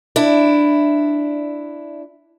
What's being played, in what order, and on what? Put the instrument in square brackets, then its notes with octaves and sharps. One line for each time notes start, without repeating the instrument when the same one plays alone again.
[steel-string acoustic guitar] D4 E4